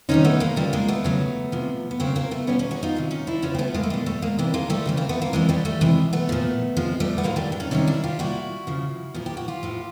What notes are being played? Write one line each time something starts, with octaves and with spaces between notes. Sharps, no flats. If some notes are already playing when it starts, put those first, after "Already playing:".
C3 D#3 G3 C#4 D#4
A3 B3
G#3 A#3
C#3 F3 G3 A3
G#3 A#3
A3 B3
C#3 F#3
C3 F3
B3
C#3 F#3 A#3 C4
A#3 C4
A3 B3
B2 G3 B3 C#4
C#4 D#4
F#4 G#4
D#4 F4
C3 D#3 F#3
C#4 D#4
D4 E4
C#3 F3 B3 C#4
C4
A3 B3
G#3 A#3
A3
B2 G3 G#3
G3 A3
G#3 A#3
C3 E3 G3
G#3 A#3
G3 A3
C#3 E3 G3
A#3 C4
A3 B3
A#3 C4
C3 E3 G3 G#3
G3 A3
G3 A3
C3 E3 G3 G#3
A3 B3
A#2 F3
C3 F3 G#3
G3 A3
B3
A2 F#3 G#3 A#3
G3 A3
D4
C#4 D#4
C3 D#3 G3 C#4 D#4
D4 E4
F4 G4
A#2 G3 E4 F#4
C#3 F3
A#2 F3 G#4
G4
F#4
F4 G4
A2 F3